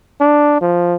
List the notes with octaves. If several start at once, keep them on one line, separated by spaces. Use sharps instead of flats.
D4
F3